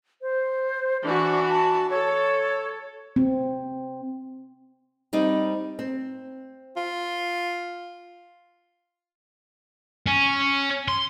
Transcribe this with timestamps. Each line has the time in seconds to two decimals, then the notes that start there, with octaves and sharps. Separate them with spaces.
0.22 C5
1.04 E3 D4 F#4
1.50 A5
1.90 A4 C#5
3.16 C4
5.13 G3 C4 D#4
5.79 C4
6.77 F4
10.07 C#4
10.88 C6